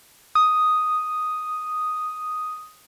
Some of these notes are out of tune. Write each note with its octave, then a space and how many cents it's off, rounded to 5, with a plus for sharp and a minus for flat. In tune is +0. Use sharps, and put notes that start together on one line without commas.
D#6 +0